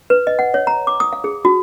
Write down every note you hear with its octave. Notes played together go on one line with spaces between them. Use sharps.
B4
D#5
F#5
C#5
A#5
D6
D#6
F5
G#4
F#4